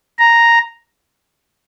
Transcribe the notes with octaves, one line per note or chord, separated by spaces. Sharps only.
A#5